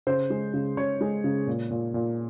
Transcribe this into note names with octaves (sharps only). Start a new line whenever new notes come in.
C#3 C5
G#3
C#3
C#3 C#5
G#3
C#3
A#2
A#2
A#2